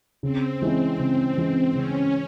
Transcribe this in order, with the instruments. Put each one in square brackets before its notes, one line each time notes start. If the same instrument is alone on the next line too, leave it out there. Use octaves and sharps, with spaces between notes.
[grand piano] C#3 [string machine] C4
[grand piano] E3 G#3 C#4 E4
C#3
E3 G#3 C#4 E4
[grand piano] C#3 [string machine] C#4